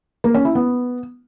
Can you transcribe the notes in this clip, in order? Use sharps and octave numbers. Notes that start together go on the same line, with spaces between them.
A#3
C#4
E4
B3